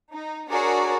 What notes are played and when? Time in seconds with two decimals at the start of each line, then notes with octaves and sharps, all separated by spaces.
0.11 D#4
0.50 D4 F#4 G#4 A#4 C#5 D5